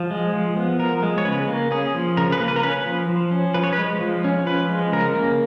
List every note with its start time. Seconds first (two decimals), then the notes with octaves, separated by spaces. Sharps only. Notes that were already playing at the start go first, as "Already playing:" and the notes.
Already playing: F3
0.11 G#3
0.33 F3
0.57 B3
0.79 F3 A#4
1.03 G#3
1.18 C#5
1.25 C#3 B4
1.48 A#3
1.71 C#4 G#4
1.95 F3
2.17 C#3 A#4
2.32 B4
2.40 A#3
2.48 B4
2.56 A#4
2.63 C#4 B4
2.86 F3
3.09 F3
3.31 C#4
3.54 F3 B4
3.64 C#5
3.73 B4
3.78 G#3
4.01 F3
4.24 C#4
4.46 F3 B4
4.69 G#3
4.93 C#3 A#4
5.15 A#3